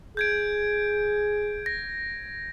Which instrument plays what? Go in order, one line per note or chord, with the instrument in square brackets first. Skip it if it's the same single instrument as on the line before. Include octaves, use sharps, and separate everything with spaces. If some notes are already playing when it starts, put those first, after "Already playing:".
[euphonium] G#4 [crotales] G6 G#6 D7
[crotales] A#6